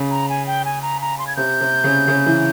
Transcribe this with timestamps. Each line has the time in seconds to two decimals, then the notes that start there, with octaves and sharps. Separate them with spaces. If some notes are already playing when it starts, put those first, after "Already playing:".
Already playing: C#3
0.11 A#5
0.29 G#5
0.47 G5
0.65 G#5
0.82 A#5
1.01 A#5
1.19 C6
1.27 G#6
1.36 C3 G6
1.61 C3
1.84 C#3
2.08 C#3
2.26 E3